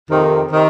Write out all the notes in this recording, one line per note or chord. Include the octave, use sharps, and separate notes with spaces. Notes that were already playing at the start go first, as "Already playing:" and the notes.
F2 C3 D#3
C3 D#3